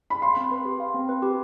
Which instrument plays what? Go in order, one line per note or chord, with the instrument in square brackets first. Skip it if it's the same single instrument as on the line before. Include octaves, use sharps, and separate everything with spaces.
[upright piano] B5
[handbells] F5 [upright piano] C6
[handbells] C4
B4
G4
F5
C4
B4
G4